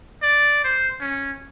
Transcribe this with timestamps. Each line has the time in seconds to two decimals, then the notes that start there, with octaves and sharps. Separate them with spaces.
0.23 D5
0.64 C5
1.01 C#4